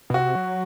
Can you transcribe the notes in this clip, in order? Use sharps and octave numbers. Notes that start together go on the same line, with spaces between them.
B2
C3 F#4
F#3